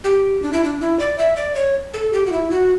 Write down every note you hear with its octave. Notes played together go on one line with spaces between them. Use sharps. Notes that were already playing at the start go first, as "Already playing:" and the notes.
G4
D4
E4
D4
E4
D5
E5
D5
C#5
A4
G4
F#4
E4
F#4